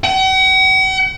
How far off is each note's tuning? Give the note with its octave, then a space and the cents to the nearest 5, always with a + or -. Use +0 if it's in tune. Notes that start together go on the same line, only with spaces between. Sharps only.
F#5 +45